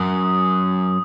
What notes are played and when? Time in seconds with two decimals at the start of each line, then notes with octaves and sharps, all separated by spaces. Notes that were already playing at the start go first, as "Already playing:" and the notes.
Already playing: F#2 D#6